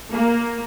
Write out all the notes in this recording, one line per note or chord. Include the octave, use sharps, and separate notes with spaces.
A#3